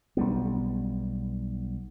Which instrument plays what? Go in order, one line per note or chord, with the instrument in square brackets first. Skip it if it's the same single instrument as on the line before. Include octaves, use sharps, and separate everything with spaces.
[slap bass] B1 G3 B3